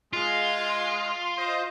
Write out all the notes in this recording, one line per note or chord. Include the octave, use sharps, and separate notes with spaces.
G#3 F4
C5 D#5